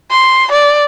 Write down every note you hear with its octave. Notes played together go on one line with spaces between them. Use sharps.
C6
D5